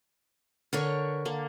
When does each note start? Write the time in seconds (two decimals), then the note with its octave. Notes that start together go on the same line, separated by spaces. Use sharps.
0.73 D3 A#4 B4 C#5 C#6
1.25 D3 A#3